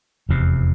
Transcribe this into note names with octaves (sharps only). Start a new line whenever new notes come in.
F1 E2 C3